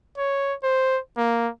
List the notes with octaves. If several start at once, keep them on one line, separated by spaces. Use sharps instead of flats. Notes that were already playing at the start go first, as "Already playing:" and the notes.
C#5
C5
A#3